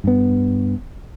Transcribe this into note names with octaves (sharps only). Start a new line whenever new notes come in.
G2 B3